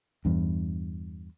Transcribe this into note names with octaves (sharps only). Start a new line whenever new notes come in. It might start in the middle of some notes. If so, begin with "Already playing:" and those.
E2 G2